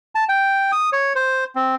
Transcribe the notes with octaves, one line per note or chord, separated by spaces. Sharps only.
A5
G5
D#6
C#5
C5
C4